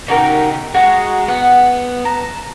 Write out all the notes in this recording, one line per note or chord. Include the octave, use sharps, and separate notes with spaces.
C#3 D#4 F#4 G4 A#4
G#3 F#4 A#5
B3 F#5
A5 A#5